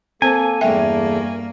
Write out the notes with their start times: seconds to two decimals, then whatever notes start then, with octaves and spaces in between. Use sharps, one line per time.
0.22 A#3 C4 A4 C5 G#5
0.61 E2 G2 A3 A#3 A4 E5 G5